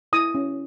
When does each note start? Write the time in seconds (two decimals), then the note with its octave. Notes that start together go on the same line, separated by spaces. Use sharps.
0.13 E4 D#6
0.35 C#4